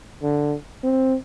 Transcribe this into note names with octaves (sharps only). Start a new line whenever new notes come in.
D3
C4